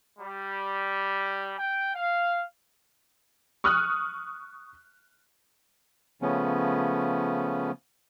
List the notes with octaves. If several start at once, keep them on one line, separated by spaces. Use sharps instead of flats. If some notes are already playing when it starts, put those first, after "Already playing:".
G3
G5
F5
C#6 D#6 F6 F#6
C#3 F3 A3 B3 C#4